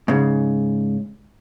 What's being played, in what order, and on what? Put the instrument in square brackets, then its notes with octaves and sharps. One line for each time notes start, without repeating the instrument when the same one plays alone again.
[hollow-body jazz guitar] G#2 C#3